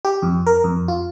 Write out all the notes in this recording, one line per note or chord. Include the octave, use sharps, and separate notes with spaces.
G4
F2
A#4
F2
F4